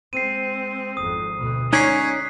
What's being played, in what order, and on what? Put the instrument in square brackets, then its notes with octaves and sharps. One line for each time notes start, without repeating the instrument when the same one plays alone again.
[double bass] G#3 C4 [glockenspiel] C7 D#7
[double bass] G#1 F2 [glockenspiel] D#6
[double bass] D2 B2
[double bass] G#3 [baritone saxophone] C#4 [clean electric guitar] D#4 C#5 D5 [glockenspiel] F#6 B6 C7